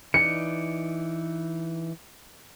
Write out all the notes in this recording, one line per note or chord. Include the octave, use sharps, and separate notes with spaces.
E3 D#4 D5 C#7